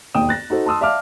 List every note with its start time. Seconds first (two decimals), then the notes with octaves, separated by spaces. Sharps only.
0.14 E1 D#2 G5 D#6 E7
0.29 F#6 A6 A#6
0.50 D#4 F#4 A4 C5
0.66 A5 C6 D#6 E6
0.81 D5 E5 F5 A5 D6 F6